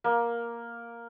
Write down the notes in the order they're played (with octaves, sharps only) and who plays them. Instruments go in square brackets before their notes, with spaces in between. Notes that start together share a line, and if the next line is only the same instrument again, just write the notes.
[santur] A#3